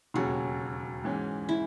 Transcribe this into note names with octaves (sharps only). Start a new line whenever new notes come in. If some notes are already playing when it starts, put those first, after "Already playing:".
E1 D#2 C#3 F#3 C#4 F#4
G#2 E3 G#3 C#4
E4